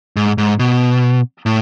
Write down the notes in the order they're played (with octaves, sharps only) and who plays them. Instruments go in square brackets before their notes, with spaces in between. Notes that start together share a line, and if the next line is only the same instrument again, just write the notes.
[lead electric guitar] G#2
G#2
B2
A2